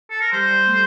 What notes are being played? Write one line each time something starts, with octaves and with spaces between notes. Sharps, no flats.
A4
A#4
G3 C5
A3